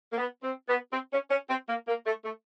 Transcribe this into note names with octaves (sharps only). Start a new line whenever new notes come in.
A#3
B3
C4
B3
C4
C#4
C#4
C4
A#3
A#3
A3
A3